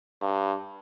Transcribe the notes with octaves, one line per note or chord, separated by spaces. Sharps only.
G2